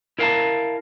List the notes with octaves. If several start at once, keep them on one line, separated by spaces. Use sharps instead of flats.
E4 A#4 F5 G5 A5 A#5